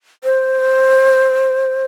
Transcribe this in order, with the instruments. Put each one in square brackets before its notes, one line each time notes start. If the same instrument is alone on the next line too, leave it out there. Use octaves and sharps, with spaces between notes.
[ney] C5